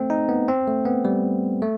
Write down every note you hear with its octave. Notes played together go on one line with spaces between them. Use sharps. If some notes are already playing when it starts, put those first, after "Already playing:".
Already playing: A3 C4
D#4
B3
C4
A3
B3
G3
A3